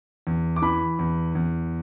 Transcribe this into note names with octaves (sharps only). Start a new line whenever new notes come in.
E2
D6
E3 B5
E2
E2